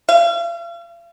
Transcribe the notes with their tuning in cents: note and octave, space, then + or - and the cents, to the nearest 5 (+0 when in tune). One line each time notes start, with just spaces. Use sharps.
F5 -40